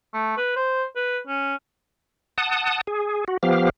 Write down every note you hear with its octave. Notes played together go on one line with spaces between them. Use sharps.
A3
B4
C5
B4
C#4
F#5 A5 D#6
G#4
F#4
F3 B3 G4 F5